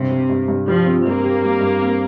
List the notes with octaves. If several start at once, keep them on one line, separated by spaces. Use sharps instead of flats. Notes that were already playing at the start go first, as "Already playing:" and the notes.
Already playing: G2 C3
G3
G2
G2
F3 G3
C4
G2 A#3
G4
G3
G2
C4